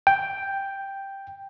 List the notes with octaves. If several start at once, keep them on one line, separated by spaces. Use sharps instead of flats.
G5